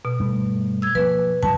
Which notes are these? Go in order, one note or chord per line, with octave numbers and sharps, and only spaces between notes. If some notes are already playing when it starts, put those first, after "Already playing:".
B2
G2 A3
E6 G#6
F3 A#3 B4
F#2 C3 F3 A5